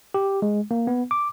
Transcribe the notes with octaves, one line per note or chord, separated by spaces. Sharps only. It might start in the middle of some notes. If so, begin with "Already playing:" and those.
G4
G#3
A#3
B3
D6